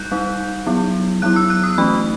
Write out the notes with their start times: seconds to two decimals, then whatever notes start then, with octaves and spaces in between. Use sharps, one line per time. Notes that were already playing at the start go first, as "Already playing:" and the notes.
Already playing: G3 D#4 F#6 G6
0.12 G3 D#4
0.67 F#3 B3 E4
1.22 F#3 B3 E4 F#6
1.36 E6
1.50 F#6
1.64 D#6
1.78 E3 A3 D#4 B5